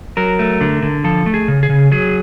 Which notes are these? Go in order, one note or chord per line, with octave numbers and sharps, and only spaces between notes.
F#3 A#4
A3
D3
D3
F3 A4
A3
G#4
C#3
G#4
C#3
F#3 G#4